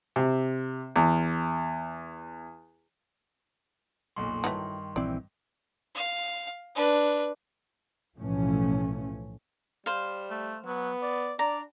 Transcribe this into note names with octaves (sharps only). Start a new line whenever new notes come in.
C3
E2
F1 B1 A#2 C6 C#6
G2 D#3 E3 F#3 A3
A#1 E3 C4 D5
F5
D4 B4
B1 A2 E3 F3 A3 C#4
G3 C5 F5
A3
F#3 B3
D5
D4 D5 A#5